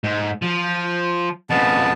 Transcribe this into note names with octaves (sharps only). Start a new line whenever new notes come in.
G#2
F3
F2 C#3 B3 A5